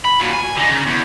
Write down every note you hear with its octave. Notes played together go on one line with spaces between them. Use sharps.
B5
A#2 F#3
G#5
D3 D#4
C#3
E2